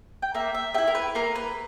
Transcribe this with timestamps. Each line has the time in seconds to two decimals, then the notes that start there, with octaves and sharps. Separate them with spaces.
0.22 G5
0.34 A#3 E5
0.54 E5
0.74 G4 E5
0.78 E4
0.87 A#4
0.95 B4
1.15 A#3 A#4
1.35 B4